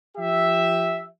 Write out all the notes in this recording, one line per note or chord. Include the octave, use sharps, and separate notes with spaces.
F3 G4 E5